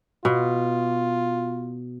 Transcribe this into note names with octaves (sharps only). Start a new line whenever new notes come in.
B2 F4